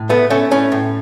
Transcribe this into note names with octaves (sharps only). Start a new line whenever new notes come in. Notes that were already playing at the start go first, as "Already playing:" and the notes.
Already playing: A2
A3 B3
A3 C#4
A2 C#4
A2